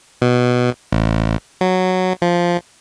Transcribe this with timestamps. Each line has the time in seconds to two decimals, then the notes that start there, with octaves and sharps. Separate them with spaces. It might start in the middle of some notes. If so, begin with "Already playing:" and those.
0.22 B2
0.92 A1
1.61 F#3
2.22 F3